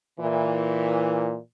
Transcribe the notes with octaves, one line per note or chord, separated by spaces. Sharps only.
A#2 E3